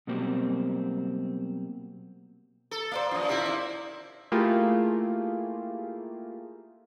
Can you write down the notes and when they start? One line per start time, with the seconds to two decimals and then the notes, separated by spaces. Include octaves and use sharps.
0.07 B2 F#3 G3 A#3 C4
2.71 A4
2.92 A#3 C5 D5 F5
3.11 F#2 F3 F4
3.27 D#3 G3 A#3 C4 C#4 E4
3.46 D5
4.32 A3 A#3 E4 F4 G4 G#4